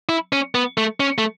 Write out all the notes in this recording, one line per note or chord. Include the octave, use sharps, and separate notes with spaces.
E4
C#4
B3
A3
C#4
A3